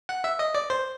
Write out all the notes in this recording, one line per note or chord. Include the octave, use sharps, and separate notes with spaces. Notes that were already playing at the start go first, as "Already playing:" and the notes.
F#5
E5
D#5
D5
C5